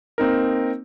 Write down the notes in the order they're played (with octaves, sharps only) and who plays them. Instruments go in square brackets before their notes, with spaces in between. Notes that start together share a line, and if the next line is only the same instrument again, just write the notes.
[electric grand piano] A#3 C4 D#4 A#4